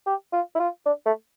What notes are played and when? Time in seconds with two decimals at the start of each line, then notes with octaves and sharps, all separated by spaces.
0.06 G4
0.33 F4
0.55 E4
0.60 F4
0.86 D4
1.06 A3